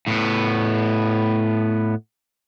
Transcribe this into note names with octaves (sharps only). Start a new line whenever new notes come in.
A2 B3